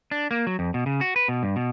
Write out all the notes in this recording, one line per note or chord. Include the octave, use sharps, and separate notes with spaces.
D4
A#3
F#3
F2
B2
C#3
F#4
B4
B2
G2
B2